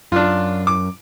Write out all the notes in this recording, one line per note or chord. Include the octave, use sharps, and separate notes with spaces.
F#2 D4 F4
D6